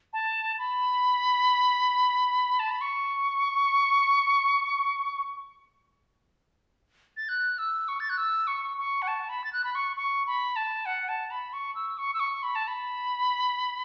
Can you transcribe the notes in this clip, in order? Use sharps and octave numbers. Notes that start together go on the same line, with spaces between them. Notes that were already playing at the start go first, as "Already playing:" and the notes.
A5
B5
A5
B5
C#6
A6
F#6
E6
C#6
A6
F#6
E6
C#6
C#6
F#5
A5
B5
A6
F#6
B5
C#6
C#6
B5
A5
F#5
A5
B5
C#6
E6
C#6
E6
C#6
B5
A5
B5